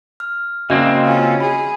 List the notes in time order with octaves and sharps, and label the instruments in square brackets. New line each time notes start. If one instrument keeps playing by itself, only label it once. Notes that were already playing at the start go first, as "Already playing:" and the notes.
[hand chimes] F6
[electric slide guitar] C#3 A#3 C4 [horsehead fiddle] D4 [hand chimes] F#4 D#5 E5
[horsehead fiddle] C#4 F4
[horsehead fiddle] G#4 [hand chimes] B5